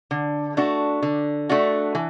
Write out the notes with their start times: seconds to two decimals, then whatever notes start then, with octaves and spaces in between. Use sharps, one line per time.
0.11 D3
0.57 A3 D4 F#4
1.02 D3
1.49 A3 D4 F#4
1.95 E3